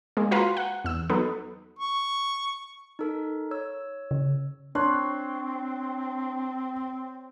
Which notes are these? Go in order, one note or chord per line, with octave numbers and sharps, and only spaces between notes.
G#3 A#3
F4 F#4 B4 F5 A#5 C6
F#5
E2 E6
F#3 B3 D#4 A4 B4
C#6
D#4 A4 A#4
C#5 E6
C#3
C4 D4 C#5 A5 C6 F#6